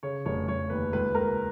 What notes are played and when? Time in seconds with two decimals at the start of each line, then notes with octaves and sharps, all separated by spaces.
0.03 C#3 C#5
0.25 F1 C#5
0.48 F1 C#5
0.70 D#2 B4
0.93 C#2 B4
1.15 C#2 A#4